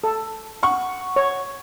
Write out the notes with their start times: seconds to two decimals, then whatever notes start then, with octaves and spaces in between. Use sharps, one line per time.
0.04 A4
0.63 F#5 C#6
1.16 C#5